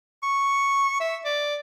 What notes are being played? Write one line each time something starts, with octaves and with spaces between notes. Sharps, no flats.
C#6
E5
D5